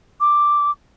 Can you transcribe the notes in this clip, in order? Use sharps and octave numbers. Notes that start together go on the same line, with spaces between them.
D6